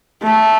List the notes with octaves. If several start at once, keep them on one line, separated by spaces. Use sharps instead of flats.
A3